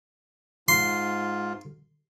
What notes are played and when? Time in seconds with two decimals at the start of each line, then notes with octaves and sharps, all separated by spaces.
0.68 G#2 F4 C6